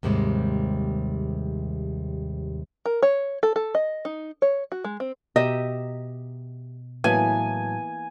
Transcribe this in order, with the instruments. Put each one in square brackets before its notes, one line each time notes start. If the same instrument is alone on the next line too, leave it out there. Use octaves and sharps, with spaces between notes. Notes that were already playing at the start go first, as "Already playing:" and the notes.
[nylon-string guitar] D#2 G#2 C3 G3 G#3
[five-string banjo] A#4
C#5
A4
A4
D#5
D#4
C#5
F#4
G#3
C4
[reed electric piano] B2 [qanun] G4 E5 A#5 [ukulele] D#5
[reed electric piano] A2 F#3 A5 [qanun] E3 A#3 B3 [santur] G#5